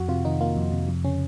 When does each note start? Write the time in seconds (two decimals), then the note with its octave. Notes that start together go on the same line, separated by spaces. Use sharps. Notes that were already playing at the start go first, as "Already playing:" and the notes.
Already playing: F2 F#4
0.09 C3 F4
0.25 D#3 D#4
0.41 A#3 F4
0.56 F2
0.73 C3
0.89 F2
1.04 C#3 C#4